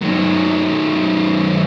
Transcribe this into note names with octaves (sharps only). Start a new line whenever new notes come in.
D#3 F#3